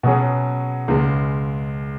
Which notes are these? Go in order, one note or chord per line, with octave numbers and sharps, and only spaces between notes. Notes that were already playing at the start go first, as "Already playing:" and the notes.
B2 F#3 C#4 G#4
C#2 C#3 G#3